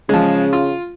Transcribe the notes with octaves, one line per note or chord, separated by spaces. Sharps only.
C#3 F3 G#3
F4